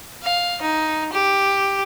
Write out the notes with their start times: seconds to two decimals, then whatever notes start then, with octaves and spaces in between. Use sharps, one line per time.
0.24 F5
0.62 D#4
1.13 G4